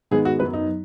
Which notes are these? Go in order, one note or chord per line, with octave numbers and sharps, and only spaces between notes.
G#2 D#3 G#3 B3 G#4
F#4
F#2 F#3 B3 B4
D#4